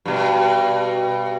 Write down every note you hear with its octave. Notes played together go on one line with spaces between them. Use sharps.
G2 B2